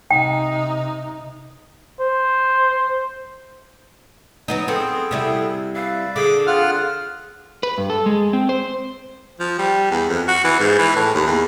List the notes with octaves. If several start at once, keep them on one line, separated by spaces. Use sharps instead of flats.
C3 D#4 G5
C5
F#3 B3 D#4 G#5
B3 C4 G#4 A4 G5
C3 G3 E4
B4 D5 E5 F5
D3 G#4 D6
C4 F4 F5 F#5 F6
B4
G2
A4
G#3
C4
C5
F3
G3
E2
F2
F#4
E3
G#2
E3
A2
D#2
E2